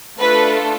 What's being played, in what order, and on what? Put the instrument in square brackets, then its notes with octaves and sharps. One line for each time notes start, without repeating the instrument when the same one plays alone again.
[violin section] A3 D4 F4 A4 B4